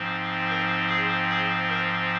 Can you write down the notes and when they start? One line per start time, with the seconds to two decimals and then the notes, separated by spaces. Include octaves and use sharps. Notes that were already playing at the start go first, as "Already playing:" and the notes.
Already playing: G#2 F3 C4
0.49 A#4
0.89 G#4
1.29 G#4
1.69 A#4